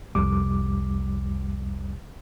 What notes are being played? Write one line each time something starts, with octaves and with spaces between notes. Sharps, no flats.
C2 F2 G3 D6